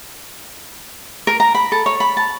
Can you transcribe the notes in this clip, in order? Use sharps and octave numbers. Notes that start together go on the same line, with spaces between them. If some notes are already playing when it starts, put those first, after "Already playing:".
A#4
A#5
B5
A4
C#5
B5
A5